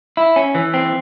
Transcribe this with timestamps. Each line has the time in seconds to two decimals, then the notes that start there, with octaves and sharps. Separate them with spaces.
0.17 E4
0.36 C#4
0.55 E3
0.74 C4